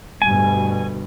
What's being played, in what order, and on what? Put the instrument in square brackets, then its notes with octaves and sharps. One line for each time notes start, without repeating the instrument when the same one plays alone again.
[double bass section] D2 G2 B2 [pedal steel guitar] G#5